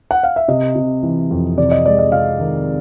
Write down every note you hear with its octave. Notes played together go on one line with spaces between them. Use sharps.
F#5
F5
E5
C3 D#5
C3
E3
F2
C3 D5
D#5
G#3 D5
D#5
C3 F5
D#3